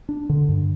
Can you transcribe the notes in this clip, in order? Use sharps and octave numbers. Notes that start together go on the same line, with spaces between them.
D4
D3
G2